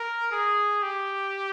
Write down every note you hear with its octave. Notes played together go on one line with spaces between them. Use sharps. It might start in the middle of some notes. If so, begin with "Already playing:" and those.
Already playing: A#4
G#4
G4